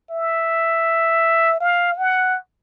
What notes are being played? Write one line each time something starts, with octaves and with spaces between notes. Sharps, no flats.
E5
F5
F#5